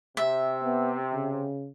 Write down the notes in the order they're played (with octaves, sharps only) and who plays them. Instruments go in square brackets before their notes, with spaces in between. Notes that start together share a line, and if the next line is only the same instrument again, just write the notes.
[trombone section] C3 [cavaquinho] E5
[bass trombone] B3
C#3